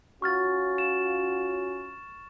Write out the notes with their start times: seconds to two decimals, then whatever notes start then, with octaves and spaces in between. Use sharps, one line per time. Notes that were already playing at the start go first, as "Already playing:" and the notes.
0.22 C#4 F4 F#4 C#6 F6 A6
0.78 E7